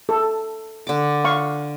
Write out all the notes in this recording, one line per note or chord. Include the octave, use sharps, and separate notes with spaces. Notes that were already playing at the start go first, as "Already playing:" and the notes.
A4
D3 D6
F5 C#6